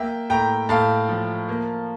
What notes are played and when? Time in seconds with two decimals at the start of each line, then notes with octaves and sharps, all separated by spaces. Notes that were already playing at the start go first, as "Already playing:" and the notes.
Already playing: A#3 E5 G5
0.30 A2 G5 A#5
0.69 A2 F5 A5
1.09 F3
1.49 A#3